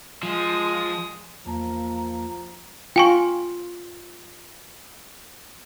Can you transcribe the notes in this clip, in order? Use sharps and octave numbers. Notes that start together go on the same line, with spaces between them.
F3 G#3 D#6
E2 F3 A#3 A5 A#5
F4 G5 G#5 C#6